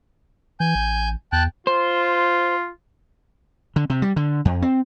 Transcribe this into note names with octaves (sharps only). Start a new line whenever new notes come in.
E3 G#5 G6
A1
E2 G5 A5 F#6
F4 C5
D3
C3
G3
D3
F2
C4